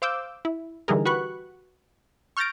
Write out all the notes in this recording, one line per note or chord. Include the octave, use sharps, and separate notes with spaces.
C5 F5 D6 E6 G6
E4
D3 E3 G3 D#4 G#4 A#4
F#4 G4 B4 B5 C#6 F#6
C#6 F6 G6 A6 A#6 D7